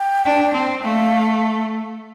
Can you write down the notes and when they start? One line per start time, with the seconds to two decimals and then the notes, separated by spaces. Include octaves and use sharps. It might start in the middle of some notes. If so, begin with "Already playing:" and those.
Already playing: G5
0.25 D4
0.54 C4
0.83 A3 F5